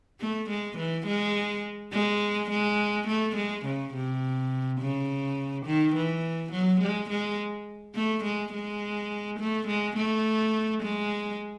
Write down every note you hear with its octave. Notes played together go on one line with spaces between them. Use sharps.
A3
G#3
E3
G#3
G#3
G#3
A3
G#3
C#3
C3
C#3
D#3
E3
F#3
G#3
G#3
A3
G#3
G#3
A3
G#3
A3
G#3